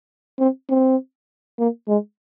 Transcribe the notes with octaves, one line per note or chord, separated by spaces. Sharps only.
C4
C4
A#3
G#3